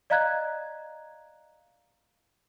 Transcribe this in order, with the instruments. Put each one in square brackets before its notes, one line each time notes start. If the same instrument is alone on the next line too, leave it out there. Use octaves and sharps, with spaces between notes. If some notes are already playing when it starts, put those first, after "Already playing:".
[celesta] D5 D#5 F5 A#5 F#6 G#6